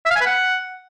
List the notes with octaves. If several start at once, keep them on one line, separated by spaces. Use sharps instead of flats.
E5
F5
G#5
B4
F#5